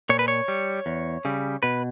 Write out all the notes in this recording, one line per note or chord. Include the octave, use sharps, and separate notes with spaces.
A#2 C#5
B4
C#5
G3
E2
C#3 G3
B2 B4